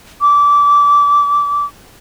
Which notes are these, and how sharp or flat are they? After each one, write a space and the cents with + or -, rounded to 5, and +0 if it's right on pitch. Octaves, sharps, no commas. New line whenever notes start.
D6 -20